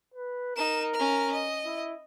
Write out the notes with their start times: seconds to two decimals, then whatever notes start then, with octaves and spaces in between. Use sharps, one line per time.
0.14 B4
0.56 D#4 A#4 E7
0.94 C#4 F6
1.32 D#5
1.65 E4